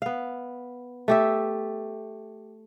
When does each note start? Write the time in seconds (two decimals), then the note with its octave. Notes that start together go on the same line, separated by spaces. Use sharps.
0.02 B3 F5
1.08 A3 G4 E5